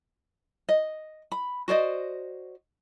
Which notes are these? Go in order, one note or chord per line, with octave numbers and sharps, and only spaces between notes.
D#5
B5
F#4 C5 D5 D#5